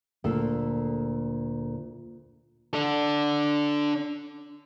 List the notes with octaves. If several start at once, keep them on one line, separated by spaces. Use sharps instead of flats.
D2 A#2 A4
D4 A4